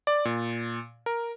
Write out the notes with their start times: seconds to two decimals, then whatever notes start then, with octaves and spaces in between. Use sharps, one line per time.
0.07 D5
0.25 A#2
1.06 A#4